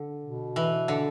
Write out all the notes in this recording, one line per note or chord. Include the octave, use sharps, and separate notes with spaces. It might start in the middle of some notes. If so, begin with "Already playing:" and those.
Already playing: D3
B2
E3
D3